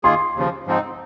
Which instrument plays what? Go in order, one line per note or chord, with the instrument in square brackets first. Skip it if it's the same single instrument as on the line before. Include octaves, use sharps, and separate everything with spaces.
[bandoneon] D#3 A#3 F4 G#4 [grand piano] C6
[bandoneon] D#2 C#3 F3
G#2 F3 C4 D#4